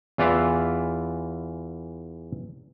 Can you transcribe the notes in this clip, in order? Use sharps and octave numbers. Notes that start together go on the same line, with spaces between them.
E2 E3 F4 D5 E5 F5